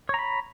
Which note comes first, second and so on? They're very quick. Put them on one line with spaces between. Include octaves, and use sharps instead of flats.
C#5 A#5 B5